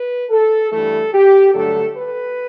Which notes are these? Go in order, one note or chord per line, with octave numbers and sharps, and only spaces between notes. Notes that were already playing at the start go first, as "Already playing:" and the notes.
Already playing: B4
A4
G2 E3 A3 A4
G4
G2 D3 F#3 A3 A4
B4